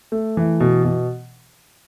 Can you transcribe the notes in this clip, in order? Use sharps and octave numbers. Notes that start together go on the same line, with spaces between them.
A3
E3
B2
B2